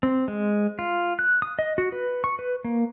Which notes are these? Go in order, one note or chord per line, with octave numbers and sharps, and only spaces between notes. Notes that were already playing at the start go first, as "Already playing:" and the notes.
C4
G#3
F4
F#6
D#6
D#5
F#4
B4
C#6
B4
A#3